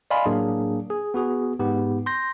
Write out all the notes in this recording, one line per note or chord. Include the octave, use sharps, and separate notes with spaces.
D5 D#5 F5 G#5 B5 C6
A2 F#3 A#3 D4 G#4
G#4
B3 F#4 G#4
G#2 B3 G4
C6 G6 A#6